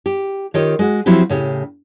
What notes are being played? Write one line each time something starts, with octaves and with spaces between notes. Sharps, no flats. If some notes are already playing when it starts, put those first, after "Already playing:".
G4
D#3 F4 G4 C#5 D#5
G#3 F#4
F3 F#3 C4 E4 F#4 G4
A2 C#3 G4